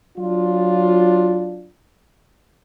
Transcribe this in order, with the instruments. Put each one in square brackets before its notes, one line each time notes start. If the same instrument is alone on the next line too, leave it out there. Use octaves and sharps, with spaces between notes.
[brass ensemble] F#3 D4 F4